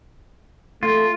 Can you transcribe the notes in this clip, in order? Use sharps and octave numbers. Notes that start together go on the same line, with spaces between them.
A3 F4